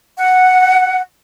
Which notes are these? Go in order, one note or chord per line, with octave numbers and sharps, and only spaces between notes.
F#5